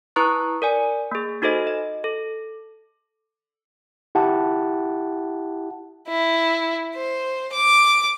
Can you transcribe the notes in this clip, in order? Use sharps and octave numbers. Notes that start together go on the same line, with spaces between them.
E4 B4 A#5 C#6 D#6 F#6
A#4 D5 G#5
A#3 G#4
D#4 F#4 A4 C5 D#5
D#5
A4
E4 G4 F#5 A5
E4
C5
D6